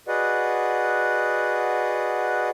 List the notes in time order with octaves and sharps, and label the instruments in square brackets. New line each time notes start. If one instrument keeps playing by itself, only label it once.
[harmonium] F#4 G#4 B4 D5 D#5 F#5